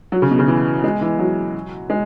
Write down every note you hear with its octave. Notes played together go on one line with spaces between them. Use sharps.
F#3
C#3
B2
C#3
E3
G#3
E3
F#3
G#3